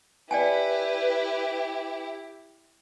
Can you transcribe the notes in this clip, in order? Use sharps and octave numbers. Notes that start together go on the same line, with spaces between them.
E4 G4 B4 D5 G5 G#5